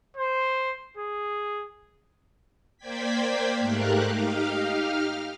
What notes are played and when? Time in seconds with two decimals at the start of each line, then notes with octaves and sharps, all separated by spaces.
0.17 C5
0.97 G#4
2.78 A#3 C5 D5 G5 G#6 B6
3.59 G#2 A3 G4 A#4 F5 F#6
4.09 D#4 G4 F5 F6